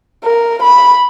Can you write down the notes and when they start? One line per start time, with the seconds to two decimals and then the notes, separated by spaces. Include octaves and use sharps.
0.24 A#4
0.63 B5